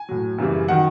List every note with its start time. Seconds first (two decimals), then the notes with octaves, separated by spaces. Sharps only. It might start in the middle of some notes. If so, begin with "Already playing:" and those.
Already playing: G#5
0.09 A2 F#3
0.38 F#2 C#3 E3 G3
0.68 D#3 F#3 F#5